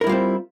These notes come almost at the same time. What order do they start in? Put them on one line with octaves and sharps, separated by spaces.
A#4 E4 G3 F4 C4